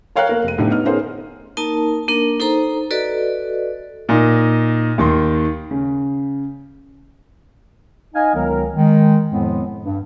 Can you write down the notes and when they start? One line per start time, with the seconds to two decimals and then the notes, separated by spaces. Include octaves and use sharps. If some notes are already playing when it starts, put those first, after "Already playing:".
0.16 A#4 C#5 F5 G5 A#5 F#6
0.29 A#3 A#4
0.44 F1 D#7
0.58 A2 D3 B3 D#4 G4
0.70 B3 D#4 F6
0.85 B3 C#4 D#4 G#4 A#4 C5
1.57 A#3 D#4 A#4 A5
2.08 A#3 D4 A#4
2.40 D#4 A4 C5 A#5
2.91 F#4 A4 B4 D5 D#5
4.09 A#2 D#4
4.98 D#2 D#3 C6
5.71 C#3
8.14 D#4 D#5 F5 G#5
8.34 C#2 D#3 F#3 B3 A#4
8.75 D#3 G#3
9.29 F2 A2 F3 G#3 B3 C4
9.84 G2